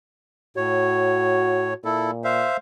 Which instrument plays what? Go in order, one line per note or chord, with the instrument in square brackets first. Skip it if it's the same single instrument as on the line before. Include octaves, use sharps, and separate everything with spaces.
[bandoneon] A2 C#5 [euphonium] F#4
[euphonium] A#2 [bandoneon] E4 A4
[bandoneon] C5 E5 F5